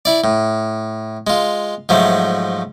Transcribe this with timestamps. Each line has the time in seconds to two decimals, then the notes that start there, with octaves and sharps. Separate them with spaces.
0.05 E4 D5
0.24 A2
1.27 G#3 F4
1.89 G#2 F3 F#3 A3